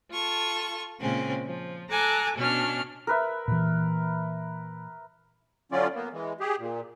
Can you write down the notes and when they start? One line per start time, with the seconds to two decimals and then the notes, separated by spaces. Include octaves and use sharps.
0.10 F4 A4 C#6
0.99 A#2 C#3 G#3 C4 C#4
1.46 F3
1.90 A4 G#5 A#5 D6 F#6
2.36 B2 C#4 D4 F6
3.07 A#4 B4 E5
3.48 A#2 E3
5.72 D3 F#3 C#4 F4 D5
5.95 A#3 B3
6.13 E3 G#3
6.40 G4 G#4
6.59 A#2